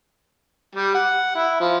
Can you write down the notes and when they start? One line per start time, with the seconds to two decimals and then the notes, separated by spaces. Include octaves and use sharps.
0.75 G3
0.94 F#5
1.35 E4
1.60 F3